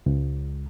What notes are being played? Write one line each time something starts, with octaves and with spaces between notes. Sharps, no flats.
C#2